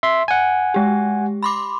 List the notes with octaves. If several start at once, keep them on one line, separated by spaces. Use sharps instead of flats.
E5 C6
F#5 G#5
G#3 G4
B5 C6 D6